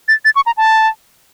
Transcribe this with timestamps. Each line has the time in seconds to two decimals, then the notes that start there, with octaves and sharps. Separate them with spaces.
0.08 A6
0.25 A6
0.36 C#6
0.46 A#5
0.57 A5